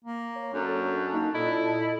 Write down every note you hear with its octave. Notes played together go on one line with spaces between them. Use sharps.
A#3
C#5
F#2 D4 A4
A#3 D#4
A#2 E4 D#5